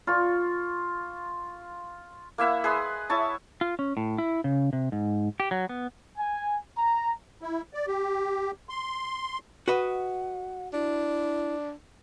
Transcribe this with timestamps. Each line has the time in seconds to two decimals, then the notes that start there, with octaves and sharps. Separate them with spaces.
0.07 F4 C#6
2.38 A#3 E4 E5 F#5
2.64 G#4 B4 D#5 C6
3.10 E4 C#5 A5
3.61 F4
3.79 C#4
3.97 A2
4.18 E4
4.44 C#3
4.73 C3
4.92 G#2
5.40 G4
5.51 F#3
5.69 B3
6.17 G#5
6.76 A#5
7.42 E4
7.73 D5
7.87 G4
8.69 C6
9.68 F#4 B4 D#5 F#5
10.73 D4 E4